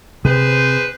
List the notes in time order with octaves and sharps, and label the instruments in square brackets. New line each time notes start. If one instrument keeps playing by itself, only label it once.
[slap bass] C3 [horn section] G#4 B4 C5